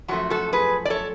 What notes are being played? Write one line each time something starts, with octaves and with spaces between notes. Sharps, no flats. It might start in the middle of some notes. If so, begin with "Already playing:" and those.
F#2 F3 A3 F#4
F#4 A4
G#4 B4
D5
A4 C#5